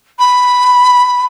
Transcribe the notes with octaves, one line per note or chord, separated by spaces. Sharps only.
B5